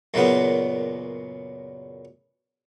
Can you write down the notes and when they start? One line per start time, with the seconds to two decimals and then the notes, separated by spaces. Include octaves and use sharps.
0.14 F#2 A#2 C#3 B3